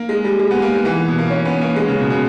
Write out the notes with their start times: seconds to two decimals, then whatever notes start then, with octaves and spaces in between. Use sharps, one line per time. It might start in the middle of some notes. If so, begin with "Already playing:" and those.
Already playing: A#3
0.09 G#3
0.24 G3
0.39 G#3
0.51 B3
0.62 A#3
0.74 G3
0.85 E3
1.08 B2
1.18 A#3
1.30 C#4
1.45 B3
1.61 A#3
1.76 G#3
1.88 C#3
1.99 B2
2.10 B2